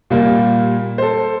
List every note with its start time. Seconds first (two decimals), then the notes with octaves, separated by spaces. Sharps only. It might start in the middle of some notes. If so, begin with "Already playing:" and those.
0.10 A#2 G3 A#3
0.98 A4 C5